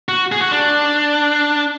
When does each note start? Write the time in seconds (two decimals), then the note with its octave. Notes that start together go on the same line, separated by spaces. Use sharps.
0.09 F#4
0.32 G#4
0.41 F#4
0.52 D4